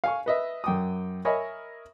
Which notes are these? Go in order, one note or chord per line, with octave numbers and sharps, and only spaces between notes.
F5 G#5 C#6
B4 D#5 E5
F#2 G5 D6 D#6
A#4 C#5 D#5 E5 G#5 B5